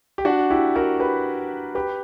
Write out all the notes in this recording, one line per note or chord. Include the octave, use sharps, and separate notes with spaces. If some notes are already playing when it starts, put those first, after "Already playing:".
G4
D4 F#4
E4 G4
F#4 A#4
G4 B4
G4 B4